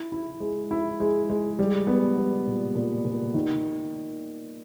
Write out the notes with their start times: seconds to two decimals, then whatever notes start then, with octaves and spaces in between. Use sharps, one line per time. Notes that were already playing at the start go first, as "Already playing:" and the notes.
Already playing: E4
0.12 E4
0.40 G#3
0.71 E4
1.00 G#3
1.30 G#3
1.59 G3
1.87 B3
2.17 G3
2.47 A#2
2.75 A#2
3.05 A#2
3.34 D#3